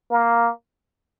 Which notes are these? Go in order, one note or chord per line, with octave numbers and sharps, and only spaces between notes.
A#3